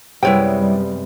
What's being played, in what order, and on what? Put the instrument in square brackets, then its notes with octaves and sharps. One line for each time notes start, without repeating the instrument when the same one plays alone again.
[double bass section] F#2 G3 [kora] C3 G#3 B3 [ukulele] E4 C#5 G5